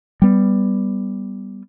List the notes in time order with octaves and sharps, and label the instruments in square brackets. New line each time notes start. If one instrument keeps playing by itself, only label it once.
[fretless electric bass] G3 B3